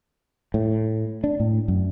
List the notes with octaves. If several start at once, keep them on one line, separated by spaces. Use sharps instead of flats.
A2
D4
A2
F#2